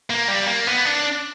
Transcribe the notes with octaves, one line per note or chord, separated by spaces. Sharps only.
A#3
G3
A#3
B3
D4